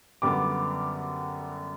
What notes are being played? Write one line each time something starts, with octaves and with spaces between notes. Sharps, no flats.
F#2 D3 G3 B3 D6